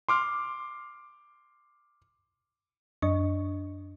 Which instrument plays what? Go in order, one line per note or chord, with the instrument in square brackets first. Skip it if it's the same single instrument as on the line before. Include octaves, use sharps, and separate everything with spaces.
[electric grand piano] C6 D6 F6
[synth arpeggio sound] F#2 D4 D#5 C#6